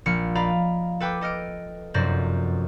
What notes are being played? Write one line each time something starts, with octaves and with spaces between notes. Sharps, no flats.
A#1 F6 C#7
D5 D#5 F5 A#5 B5
A4 B4 G5 D6
A4 D#5 F6 D7
F1 F#2 C5 D5 A#6